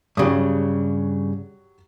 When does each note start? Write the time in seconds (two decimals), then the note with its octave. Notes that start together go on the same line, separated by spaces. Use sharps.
0.17 G2 C#3 F#3 G4 D#6